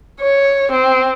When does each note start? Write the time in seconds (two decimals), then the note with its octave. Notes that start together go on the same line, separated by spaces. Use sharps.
0.20 C#5
0.72 C4